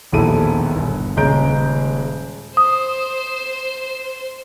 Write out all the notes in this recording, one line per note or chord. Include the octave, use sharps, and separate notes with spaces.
E1 A#1 D#2 E4 A4 D#7
G1
D#1 C#3 G#3 A#5 G6 D7
C5 D#6